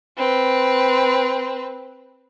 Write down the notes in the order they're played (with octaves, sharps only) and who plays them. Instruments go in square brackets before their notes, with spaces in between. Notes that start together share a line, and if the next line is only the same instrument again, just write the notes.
[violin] C4 B4